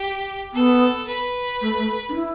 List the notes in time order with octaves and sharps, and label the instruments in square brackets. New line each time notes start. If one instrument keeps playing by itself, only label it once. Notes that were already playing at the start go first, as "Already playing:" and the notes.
Already playing: [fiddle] G4
[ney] B3 [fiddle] A4
[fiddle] B4
[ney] A3
A3
D4
E4